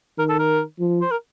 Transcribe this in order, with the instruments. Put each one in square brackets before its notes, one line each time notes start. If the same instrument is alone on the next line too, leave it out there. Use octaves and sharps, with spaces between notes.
[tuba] D#3 [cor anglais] A#4
[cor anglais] A4
A#4
[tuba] F3
[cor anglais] C5
A#4